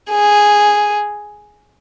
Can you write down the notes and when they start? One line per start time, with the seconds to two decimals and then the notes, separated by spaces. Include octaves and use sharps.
0.10 G#4